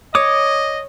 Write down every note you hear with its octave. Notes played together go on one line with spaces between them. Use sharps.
C#5 D#5 D6 D#6